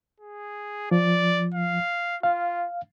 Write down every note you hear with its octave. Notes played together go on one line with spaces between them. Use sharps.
G#4
F3 D5
F5
F4 F5